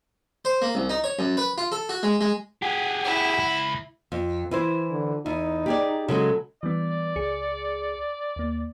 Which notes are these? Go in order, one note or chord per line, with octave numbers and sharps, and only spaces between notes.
C5
A#3
C2
D#4
C#5
F#2
B4
F4
A4
F#4
G#3
G#3
G4 G#4 F#5
E4
C#2 B5
F2
E3 E4 C5
D3
E2 D#4
G4 G#4 D5
C#3 F#3 G#3 A4
E3 G3 B3 D5
C#2 G#4 C#7
D#2 A#3